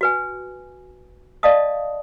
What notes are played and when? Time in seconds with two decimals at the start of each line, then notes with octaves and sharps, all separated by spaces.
0.01 F#4 B4 G#5
1.43 D5 D#5 F5 A5 D#6